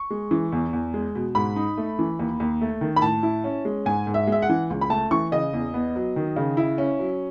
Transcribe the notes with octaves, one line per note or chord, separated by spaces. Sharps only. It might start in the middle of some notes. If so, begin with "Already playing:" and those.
Already playing: C#6
G#3
E3
E2
E2
G#3
B2
G#2 B5
D#4
A3
E3
D#2
D#2
A3
D#3
B5
A2 A5
E4
C#4
G#3
G#2 G#5
G#2
E5
G#3 E5
F#5
E3
C#2
B5
A3 A5
E3 C#6
C#3 D#5
E2
B3
F#3
D#3
C#3
E4
C#4
F#3